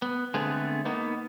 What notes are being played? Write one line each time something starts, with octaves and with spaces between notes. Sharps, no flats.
B3
D3 G#3 A3 B3 C4 G#4
A#3 B3 D#4